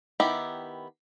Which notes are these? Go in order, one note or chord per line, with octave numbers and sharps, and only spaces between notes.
D#3 B3 E4 G4